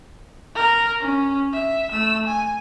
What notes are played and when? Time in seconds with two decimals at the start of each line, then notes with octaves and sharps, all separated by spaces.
0.55 A#4
1.01 C#4
1.53 E5
1.92 A3 E6
2.27 G#5